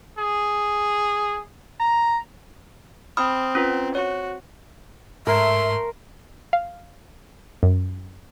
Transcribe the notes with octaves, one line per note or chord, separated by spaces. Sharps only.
G#4
A#5
C4 B5 D#6 F6
C#4 F4 B4
F#4 C#5
G#2 A3 A#4 E5 C6
F5
F#2